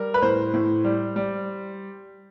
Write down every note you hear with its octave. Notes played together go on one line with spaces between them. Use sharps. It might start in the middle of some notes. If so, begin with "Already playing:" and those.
Already playing: G3 A#4
B4
A2 C5
A2
G3
G3